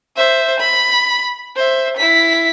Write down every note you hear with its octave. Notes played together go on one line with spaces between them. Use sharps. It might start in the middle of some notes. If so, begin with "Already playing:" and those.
C5 E5
B5
C5 E5
E4 B6